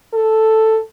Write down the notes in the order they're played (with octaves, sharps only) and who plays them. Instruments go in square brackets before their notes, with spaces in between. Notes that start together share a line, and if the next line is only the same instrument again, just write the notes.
[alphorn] A4